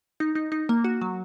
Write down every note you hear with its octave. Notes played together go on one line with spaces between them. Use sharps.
D#4
D#4
D#4
A#3
F#4
F#3